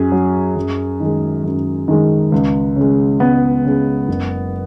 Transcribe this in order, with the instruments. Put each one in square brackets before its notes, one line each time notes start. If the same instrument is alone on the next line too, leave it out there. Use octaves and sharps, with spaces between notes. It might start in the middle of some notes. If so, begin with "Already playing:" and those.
Already playing: [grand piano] F#2 G#4
F#3
F#2
D#3 G#3
F#2
D#3 G#3
C#2
C#3 G#3
C#2 B3
C#3 G#3
F#1